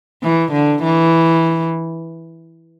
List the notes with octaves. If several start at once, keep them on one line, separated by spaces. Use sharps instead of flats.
E3
D3
E3